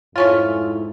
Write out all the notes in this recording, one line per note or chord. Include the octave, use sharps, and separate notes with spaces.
F2 G#2 A3 C#4 E4 F4